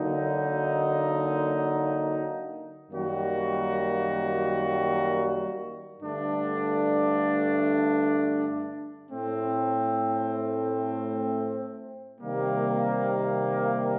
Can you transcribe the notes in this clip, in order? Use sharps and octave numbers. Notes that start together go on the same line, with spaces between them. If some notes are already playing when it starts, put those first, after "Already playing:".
Already playing: D3 F#3 A#3 D#4 F#4
F#2 D#3 G3 A#3 F#4
G2 D3 A3 D4
A2 A3 C4
C3 D#3 G3 A#3